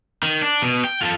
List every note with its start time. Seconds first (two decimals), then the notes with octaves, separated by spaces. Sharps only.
0.23 D#3
0.42 D4
0.62 B2
0.84 G5
1.01 F4 A4